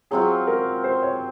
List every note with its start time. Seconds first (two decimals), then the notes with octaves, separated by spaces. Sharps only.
0.11 F#3 C4 F4 G#4
0.47 A#4
0.84 C5
1.03 C#5